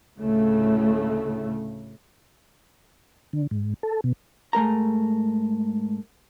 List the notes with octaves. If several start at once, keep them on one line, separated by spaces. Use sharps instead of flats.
D2 A2 C#3 A3
D3
G#2
A4
B2
G#2 A3 A#4 A#5